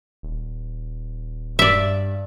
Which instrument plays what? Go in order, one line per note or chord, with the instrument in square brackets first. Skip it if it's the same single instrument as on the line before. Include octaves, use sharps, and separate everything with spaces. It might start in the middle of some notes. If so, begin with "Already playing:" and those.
[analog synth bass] D#1
[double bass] G2 [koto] D5 E5